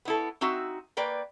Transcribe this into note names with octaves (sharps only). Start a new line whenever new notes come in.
B3 E4 A4
C4 D#4 F#4 E5
A#3 B4 D5 G5